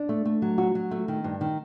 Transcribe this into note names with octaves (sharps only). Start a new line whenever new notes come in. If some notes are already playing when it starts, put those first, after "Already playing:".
Already playing: D4
A3
A3
F#3
F#4
F#3
A3
D#3
G2
D#3